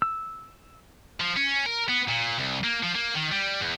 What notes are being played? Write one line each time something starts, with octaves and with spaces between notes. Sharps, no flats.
E6
F3
C#4
A#4
B3
A#2
C2
A#3
F3
A#3
D#3
G3
E2